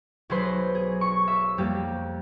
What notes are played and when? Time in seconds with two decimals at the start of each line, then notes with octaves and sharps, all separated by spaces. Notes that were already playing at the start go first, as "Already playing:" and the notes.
0.30 B1 F#3 G#4 B4 C5 C6
0.75 G#4
1.01 C#6
1.28 E5
1.58 F2 G3 A#3 G4